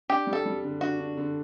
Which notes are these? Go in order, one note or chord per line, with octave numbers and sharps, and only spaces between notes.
D4 G4
G3
A4
G3
D3
D4 F#4
D4
D3